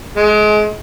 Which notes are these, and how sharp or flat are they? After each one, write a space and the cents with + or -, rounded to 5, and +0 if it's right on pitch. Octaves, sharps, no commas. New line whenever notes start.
G#3 +30